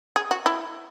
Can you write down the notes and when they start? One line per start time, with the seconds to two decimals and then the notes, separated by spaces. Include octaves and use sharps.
0.16 G#4
0.31 F#4
0.46 E4